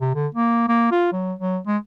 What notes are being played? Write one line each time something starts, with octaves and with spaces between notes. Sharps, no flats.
C3
D3
A#3
A#3
F4
F#3
F#3
G#3